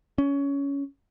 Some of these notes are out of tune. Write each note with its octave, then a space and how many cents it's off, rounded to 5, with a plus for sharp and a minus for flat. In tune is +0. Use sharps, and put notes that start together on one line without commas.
C#4 +15